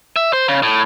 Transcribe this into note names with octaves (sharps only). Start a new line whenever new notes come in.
E5
C5
C#3
A2